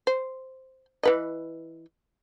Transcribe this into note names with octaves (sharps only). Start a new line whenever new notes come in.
C5
E3 B4 D#5